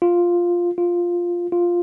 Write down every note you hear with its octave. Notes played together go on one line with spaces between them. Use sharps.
F4
F4
F4